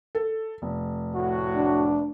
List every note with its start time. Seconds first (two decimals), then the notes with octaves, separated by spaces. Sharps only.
0.15 A4
0.62 F1
1.15 A2 F#4
1.56 D4